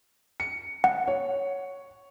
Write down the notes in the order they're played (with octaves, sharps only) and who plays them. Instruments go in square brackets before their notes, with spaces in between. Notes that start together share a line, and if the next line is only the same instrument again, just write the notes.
[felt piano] C#7
[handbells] F#5
[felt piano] C#5